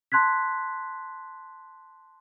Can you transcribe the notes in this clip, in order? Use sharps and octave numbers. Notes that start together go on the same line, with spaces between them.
A5 C6 F#6 G#6 B6